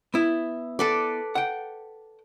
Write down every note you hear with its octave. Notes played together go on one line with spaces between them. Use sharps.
B3 E4
A4 B4 D5
F#5 G5